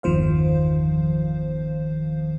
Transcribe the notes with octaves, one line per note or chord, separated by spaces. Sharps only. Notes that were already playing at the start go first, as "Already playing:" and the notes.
G1 E2 D#3 F3 C5 F5